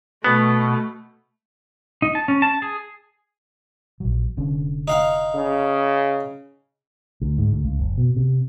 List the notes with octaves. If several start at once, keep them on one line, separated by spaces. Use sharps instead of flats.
B2 A3 B3
D#4
A5
C#4
A5
G#4
A#1 F#3
F1 D3 C#4
D#4 F5 F#5
C#3
D2
G#2
D2
C#2
F#1
B2
C3